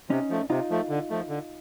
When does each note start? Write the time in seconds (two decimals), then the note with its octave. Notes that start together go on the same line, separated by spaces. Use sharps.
0.09 C3 C#4 D#4
0.30 F3 A3
0.50 C3 D#4 F4
0.70 F3 A3
0.89 D3
1.10 F3 A3
1.29 D3